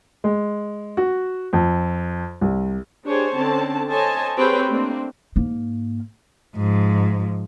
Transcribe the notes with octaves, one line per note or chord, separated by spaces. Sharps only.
G#3
F#4
F2
C2
D4 G4 G#4 C5 C#5 G#5
D3 C4 C#4 A5
A4 C5 C#5 D#5 G#5 A5
C4 G4 G#4 B4 C#5 G5
A3 A#3 C4 D4
G#2 A#3
G#2 F3